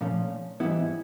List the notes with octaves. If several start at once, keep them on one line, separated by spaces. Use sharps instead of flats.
A#2 F3 A3 C#4
G#2 E3 G3 B3 E4